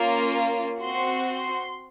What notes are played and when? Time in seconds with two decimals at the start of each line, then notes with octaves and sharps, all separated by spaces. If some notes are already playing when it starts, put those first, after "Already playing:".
Already playing: A#3 C#4 F4
0.81 C4 F#4 C6
1.25 C6